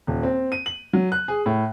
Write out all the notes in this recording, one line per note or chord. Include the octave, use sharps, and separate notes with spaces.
D#1
C4
D#7
F#7
F#3
F#6
G#4
A2